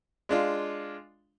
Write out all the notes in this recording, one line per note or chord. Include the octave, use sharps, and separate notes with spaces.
G#3 D4 F4